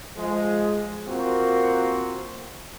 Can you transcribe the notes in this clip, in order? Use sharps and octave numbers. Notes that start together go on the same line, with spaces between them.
F3 G#3
A#3 C4 F4 F#4 A#4